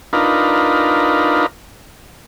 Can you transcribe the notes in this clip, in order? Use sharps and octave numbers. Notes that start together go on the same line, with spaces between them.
D4 D#4 F4 A#4 B4